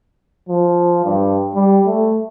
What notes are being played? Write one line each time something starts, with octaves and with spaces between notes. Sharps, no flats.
F3
G2
G3
A3